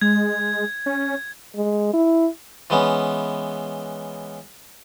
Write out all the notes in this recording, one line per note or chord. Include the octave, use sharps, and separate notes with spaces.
G#3 G#6
C#4
G#3
E4
E3 G#3 B3 C#4